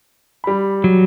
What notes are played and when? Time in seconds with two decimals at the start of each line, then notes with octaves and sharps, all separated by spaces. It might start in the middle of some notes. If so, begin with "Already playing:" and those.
0.44 G3 B5
0.84 F#3